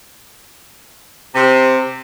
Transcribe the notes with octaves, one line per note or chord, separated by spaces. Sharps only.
C3